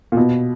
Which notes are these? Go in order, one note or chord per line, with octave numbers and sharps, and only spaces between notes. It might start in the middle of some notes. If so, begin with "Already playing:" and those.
A#2
B2